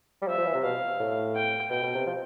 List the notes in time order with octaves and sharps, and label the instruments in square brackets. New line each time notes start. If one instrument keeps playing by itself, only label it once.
[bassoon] G3
[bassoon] F3 [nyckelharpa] E5
[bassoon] F3
E3
C3
[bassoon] B2 [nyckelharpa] F5
[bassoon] A2
[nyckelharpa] G5
[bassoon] B2 [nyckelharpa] G5
[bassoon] B2
C3
F3